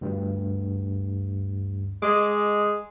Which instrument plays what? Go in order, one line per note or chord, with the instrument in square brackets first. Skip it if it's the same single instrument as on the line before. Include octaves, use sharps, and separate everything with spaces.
[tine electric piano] D2 G2
[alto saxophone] G#3 [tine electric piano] D#5 G#5 D6